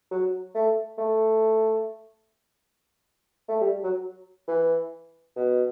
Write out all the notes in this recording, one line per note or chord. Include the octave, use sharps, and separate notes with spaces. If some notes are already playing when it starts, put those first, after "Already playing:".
F#3
A3
A3
A3
G3
F#3
E3
B2